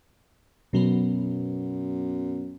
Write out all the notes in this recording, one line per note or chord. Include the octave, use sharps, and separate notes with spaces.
F#2 B2 F#3 B3